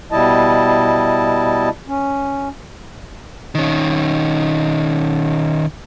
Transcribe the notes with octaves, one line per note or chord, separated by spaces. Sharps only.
B2 G3 E4 D#5 A5
C#4
D#3 C#4